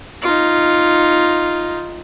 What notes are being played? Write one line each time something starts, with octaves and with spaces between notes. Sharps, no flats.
D#4 F4